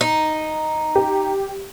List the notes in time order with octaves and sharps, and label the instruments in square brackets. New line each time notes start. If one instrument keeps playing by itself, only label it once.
[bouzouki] D#4
[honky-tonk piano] G4